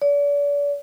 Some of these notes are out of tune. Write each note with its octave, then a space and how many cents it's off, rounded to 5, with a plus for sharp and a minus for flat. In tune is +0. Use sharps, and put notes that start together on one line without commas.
D5 -40